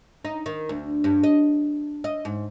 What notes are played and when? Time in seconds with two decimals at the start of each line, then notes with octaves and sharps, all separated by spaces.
0.25 D#4
0.46 D#3
0.69 D2
1.04 G2
1.23 D#5
2.04 D#5
2.25 G#2